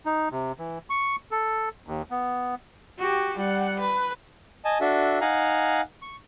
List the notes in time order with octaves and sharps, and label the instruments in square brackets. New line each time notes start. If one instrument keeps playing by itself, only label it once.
[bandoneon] D#4
C3
E3
C#6
A4
D#2
B3
[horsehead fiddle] F#4 G4
G3 F#5
B4
[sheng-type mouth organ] D#5 G#5 A5
D4 F#4 A4 E5
D#4 F5 F#5 G#5 A#5
C#6